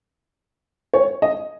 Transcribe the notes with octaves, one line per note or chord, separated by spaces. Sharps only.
C#5
D#5